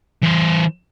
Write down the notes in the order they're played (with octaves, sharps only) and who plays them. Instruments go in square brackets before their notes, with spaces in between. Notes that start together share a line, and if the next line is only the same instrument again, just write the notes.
[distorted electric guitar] E3 C5